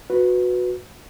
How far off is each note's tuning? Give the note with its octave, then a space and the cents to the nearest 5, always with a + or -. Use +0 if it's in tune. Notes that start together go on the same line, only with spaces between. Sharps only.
F#4 -15 B4 +0